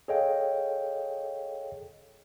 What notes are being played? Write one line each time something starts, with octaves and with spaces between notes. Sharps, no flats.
G#4 A4 C#5 D#5 F5 G5